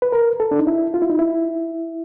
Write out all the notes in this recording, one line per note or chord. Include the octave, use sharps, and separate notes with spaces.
B4
A#4
A4
D4
D#4
E4
F4
E4
D#4
E4